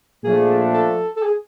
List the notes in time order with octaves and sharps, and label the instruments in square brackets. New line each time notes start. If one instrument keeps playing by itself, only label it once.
[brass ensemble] A#2 F3 A3 D4 [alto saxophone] G#4
[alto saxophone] A4
A4
G#4